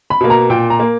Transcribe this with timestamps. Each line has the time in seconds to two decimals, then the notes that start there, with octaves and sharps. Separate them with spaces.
0.10 B5
0.21 B2 A#3
0.30 A#5
0.50 A#2 G5
0.70 A#5
0.80 A#3